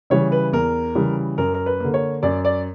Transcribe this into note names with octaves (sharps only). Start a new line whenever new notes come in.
C#3 E3 G3 C#5
B4
E2 A#4
C#3 E3 G3
F#2 A#4
A#4
B4
D3 A#3
C#5
F#2 D5
D5